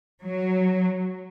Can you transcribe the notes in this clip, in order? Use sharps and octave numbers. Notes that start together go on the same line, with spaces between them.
F#3